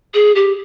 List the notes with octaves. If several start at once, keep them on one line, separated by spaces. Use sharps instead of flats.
G#4
G4